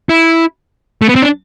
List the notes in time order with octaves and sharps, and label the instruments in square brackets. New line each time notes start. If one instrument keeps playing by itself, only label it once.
[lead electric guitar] E4
A3
B3
C4
D4